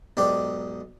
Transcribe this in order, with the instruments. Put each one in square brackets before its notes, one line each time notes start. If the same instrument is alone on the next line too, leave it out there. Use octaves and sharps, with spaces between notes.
[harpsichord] B1 G#2 D4 G4 D5